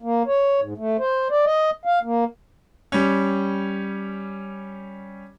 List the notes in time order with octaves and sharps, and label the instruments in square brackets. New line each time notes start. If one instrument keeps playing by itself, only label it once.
[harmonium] A#3
C#5
G#2
A3
C5
D5
D#5
F5
A#3
[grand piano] G3 C#4